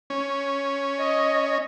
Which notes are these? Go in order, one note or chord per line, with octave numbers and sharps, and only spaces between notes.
C#4
D#5